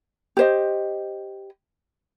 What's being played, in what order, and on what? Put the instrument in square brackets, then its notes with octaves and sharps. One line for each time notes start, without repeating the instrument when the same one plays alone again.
[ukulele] G4 C5 D#5